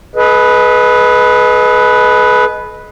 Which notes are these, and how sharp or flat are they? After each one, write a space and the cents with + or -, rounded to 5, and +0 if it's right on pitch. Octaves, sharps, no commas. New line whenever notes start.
G#4 +45 B4 +0 D#5 +0